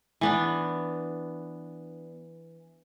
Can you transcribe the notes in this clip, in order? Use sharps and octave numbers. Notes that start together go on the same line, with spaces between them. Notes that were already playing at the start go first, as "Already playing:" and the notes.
E3 B3 D4